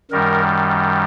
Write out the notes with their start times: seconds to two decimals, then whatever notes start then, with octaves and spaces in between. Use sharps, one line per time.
0.11 F#2 D#3 G3 A#4